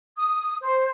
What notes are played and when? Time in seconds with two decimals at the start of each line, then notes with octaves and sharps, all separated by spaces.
0.17 D#6
0.61 C5